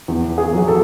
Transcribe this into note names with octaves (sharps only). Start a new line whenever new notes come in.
E2
G#4
F#3
A4